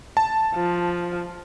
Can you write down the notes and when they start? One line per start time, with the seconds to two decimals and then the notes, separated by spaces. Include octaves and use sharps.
0.17 A5
0.55 F3